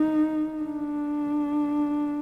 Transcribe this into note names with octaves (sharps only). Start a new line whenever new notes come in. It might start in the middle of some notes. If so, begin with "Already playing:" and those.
Already playing: D#4
D4